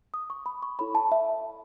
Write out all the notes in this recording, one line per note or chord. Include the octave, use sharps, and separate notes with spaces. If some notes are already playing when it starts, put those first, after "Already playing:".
D#6
C#6
B5
C#6
E4 A4 C#5 B5
A5
E5